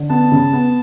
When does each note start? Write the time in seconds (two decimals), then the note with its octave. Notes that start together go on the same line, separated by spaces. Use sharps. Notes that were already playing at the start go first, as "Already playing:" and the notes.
Already playing: D3
0.10 B3 A5
0.32 C#3
0.53 B3